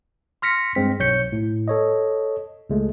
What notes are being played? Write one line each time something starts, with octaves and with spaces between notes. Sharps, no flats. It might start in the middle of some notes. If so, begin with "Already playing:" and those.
C6 F6 A#6 B6 C#7
G2 G#3 C4 B6
B1 C#5 G6 C#7
A2
A4 C#5 D#5
C#2 G#3 A3